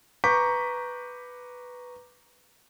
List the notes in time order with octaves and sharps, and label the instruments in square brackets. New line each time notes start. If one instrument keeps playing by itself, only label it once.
[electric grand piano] B4 A#5 C#6 D6 G6 B6